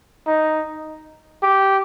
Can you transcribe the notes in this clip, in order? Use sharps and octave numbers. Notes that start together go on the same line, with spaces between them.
D#4
G4